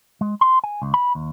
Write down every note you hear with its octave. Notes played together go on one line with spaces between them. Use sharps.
G#3
C6
G#5
C#2
B5
D#2